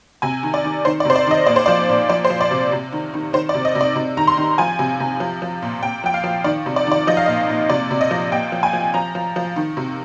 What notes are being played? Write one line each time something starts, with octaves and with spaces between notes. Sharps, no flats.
C3 G#5
D#3
D5
D#3
D#3 C5
D5
C3 C5
D5
D#3 D#5
A#2 D5
C5
F3 D5
A#2
F3 D5
C5
F3
D5
C3
C3
D#3
D#3
D#3 C5
D5
C3
D#5
C3
D5
C3
D#3 A#5
C6
D#3
F3 G#5
C3
C3
F3
F3
A#2
A#2 G5
F3 G5
F5
F3
D#3 D5
C3
D5
D#3 D5
F3 D#5
F5
A#2 D#5
A#2
C3 D5
C3
D#5
F3
A#2 G5
F3
G#5
F3
F3 A#5
F3
F3
D#3
C3